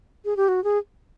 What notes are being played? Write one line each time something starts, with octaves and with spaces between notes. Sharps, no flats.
G#4
G4
F#4
G#4